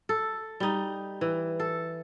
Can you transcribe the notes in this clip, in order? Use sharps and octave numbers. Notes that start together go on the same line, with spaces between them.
A4
G3 D#4
E3
A4